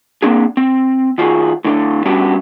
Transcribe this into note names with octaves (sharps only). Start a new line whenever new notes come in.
A#3 C4 D4 G#4
C4
D#3 F4 F#4 G#4
A2 D3 D4 A4
G3 B3 C#4 D4 F#4 G4